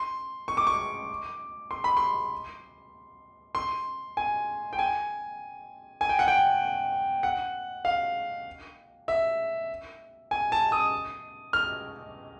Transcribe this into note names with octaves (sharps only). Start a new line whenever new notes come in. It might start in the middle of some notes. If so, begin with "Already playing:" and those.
Already playing: C6
C#6
D6
C#6
C6
B5
C6
C6
G#5
G5
G#5
G#5
G5
F#5
G5
F#5
F5
E5
G#5
A5
D#6
F6